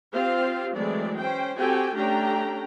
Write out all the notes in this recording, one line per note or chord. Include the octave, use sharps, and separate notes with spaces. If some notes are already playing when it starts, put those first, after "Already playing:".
C4 F4 G4 C5 F5
E3 F#3 G#3 A3 C4 D5
C#4 C5 G5
C4 F#4 G4 A4 G5 G#5
A3 C#4 D4 G4 G5 A#5